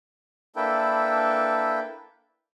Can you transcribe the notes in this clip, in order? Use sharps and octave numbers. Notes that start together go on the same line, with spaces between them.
A#3 D4 E4 A4 B4 G5